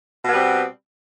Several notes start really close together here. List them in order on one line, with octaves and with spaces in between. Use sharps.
B2 B3 G3 C4